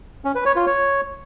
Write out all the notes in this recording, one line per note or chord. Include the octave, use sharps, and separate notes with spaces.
C#4
B4
C#5
F4
C#5